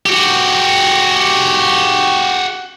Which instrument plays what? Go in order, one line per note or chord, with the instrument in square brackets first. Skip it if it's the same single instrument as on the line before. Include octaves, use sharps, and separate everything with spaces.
[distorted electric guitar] F#4 G4